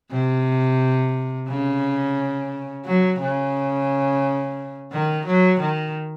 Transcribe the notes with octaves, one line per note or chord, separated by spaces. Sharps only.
C3
C#3
F#3
C#3
D#3
F#3
D#3